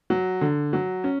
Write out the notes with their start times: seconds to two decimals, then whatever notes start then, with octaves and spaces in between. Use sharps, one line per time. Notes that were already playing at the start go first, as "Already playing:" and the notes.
0.10 F#3
0.41 D3
0.73 F#3
1.04 C#4